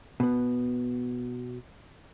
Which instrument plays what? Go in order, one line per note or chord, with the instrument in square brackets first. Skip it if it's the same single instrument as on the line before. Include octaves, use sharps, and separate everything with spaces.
[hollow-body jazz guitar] B2 B3